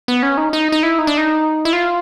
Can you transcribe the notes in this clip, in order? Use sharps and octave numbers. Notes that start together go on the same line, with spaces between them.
B3
C#4
D#4
D#4
D#4
E4
D#4
D4
D#4
E4
F4